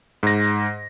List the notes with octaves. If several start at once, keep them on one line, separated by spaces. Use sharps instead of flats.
G#2 A#6